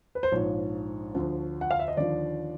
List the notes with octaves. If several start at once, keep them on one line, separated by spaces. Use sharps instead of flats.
B4
C5
A#1 G#2 F3 C#5
D2 D3 F3
F#5
F5
E5
D#5
D#2 D3 F3 D5